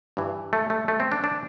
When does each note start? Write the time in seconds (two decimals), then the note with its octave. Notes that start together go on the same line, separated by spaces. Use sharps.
0.17 G2 E3
0.53 A3
0.70 A3
0.88 A3
1.00 C4
1.12 D4
1.24 D4